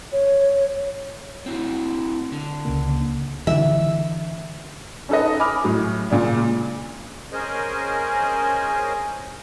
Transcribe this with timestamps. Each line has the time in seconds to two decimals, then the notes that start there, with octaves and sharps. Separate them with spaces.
0.12 C#5
1.46 C4 E4 F#4
2.32 D3
2.65 C#2 C#3 A#3
3.47 D3 E3 E5
5.09 C#4 D#4 A4 B4 D#5
5.40 G#5 B5 D6 D#6 F6
5.64 A2 F#3
6.10 A#2 C#3 G#3 D4
7.33 C#4 G#4 A#4 C5 D#5 G#5